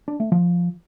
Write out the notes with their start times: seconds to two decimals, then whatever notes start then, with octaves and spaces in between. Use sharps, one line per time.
0.08 D4
0.20 A3
0.32 F3